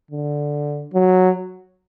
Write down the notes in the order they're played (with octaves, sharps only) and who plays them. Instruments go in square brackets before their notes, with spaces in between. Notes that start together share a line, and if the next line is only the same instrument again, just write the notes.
[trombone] D3
F#3